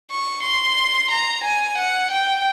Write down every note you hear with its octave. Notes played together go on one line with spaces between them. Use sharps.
C#6
C6
A#5
G#5
F#5
G5